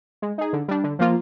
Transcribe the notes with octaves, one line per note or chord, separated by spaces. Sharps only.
G#3
D#4 G#4
D3
G3 D4
D3
F3 A#3 F4